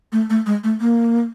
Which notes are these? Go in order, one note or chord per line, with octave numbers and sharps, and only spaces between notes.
A3
A3
G#3
A3
A#3